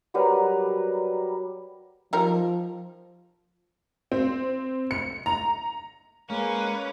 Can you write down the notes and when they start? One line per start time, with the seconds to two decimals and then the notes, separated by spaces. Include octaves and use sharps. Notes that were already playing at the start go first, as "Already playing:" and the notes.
0.14 F#3 G3 A#4 B4
2.13 F3 G3 D#4 A#4
4.12 C4
4.91 C#7
5.26 A#5
6.30 G#3 A#3 C#4 B4